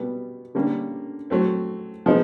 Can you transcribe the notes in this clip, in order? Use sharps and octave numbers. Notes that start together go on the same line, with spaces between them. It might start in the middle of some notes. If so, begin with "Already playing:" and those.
Already playing: B2 G3 B3
D3 G3 A#3 C#4
F#3 A3 C4
C3 F3 G#3 B3 D#4